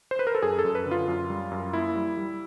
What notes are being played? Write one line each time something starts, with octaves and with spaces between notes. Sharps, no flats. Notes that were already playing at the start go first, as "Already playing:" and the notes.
C5
B4
A#4
A4
F#2 G#4
A4
F#2
B4
D3
F4
F#2
G3
F#2
A#3 E4
G3
G3